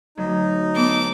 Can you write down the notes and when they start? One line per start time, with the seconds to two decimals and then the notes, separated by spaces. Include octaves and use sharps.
0.17 D2 F#3 D#4
0.76 B3 A4 D6